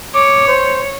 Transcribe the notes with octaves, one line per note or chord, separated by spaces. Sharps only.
C#5 D6
C5